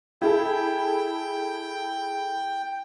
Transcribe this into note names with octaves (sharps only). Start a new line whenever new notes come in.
E4 G#4 A4 G5